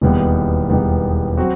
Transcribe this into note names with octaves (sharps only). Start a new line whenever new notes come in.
E1 D#2 D#3 G3 B3
E1 D#2 D#3 G3 B3
F#3 C4 F#4